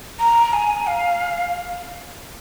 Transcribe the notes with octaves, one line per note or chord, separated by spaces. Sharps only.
A#5
G#5
F5